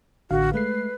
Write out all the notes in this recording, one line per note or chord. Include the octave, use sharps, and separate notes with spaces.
A1 D3 F#4 F5
G#3 A3 B4 C7